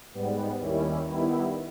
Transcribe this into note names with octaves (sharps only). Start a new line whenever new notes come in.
G#2 G3 B3
D#2 D#3 G3 C#4 E4
D#3 G3 B3 E4